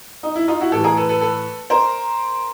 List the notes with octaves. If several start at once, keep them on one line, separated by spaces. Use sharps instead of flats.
D#4
E4
D#4 F4
E4 F#4
A2 E3 G4 A4
G#4 A#4
A4 B4
A4 B4
A4 B4
A#4 C5